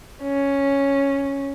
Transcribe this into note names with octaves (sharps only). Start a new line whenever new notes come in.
C#4